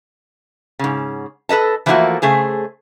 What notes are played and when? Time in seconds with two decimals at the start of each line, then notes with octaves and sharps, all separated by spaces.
0.79 G#2 C#3
1.49 A4 B4 D#5 A5
1.86 E3 F3 A3 A#3 E4 F#4
2.22 C#3 A3 G#4 C5